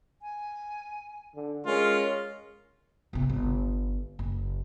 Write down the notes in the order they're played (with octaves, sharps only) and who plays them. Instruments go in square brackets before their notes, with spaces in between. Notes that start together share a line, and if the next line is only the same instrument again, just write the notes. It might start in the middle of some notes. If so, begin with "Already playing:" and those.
[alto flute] G#5
[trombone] D3
[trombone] G#3 [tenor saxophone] C#4 [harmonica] F4 [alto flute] A#4
[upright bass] G1 C3
G1
F#1